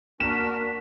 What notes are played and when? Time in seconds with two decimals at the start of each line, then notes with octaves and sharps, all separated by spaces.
0.20 A#3 D4 F#4 A#4 B6 E7